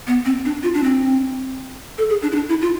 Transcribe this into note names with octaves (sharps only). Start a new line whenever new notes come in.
B3
C4
D4
F4
D4
C4
A4
G#4
D4
E4
D4
E4
F4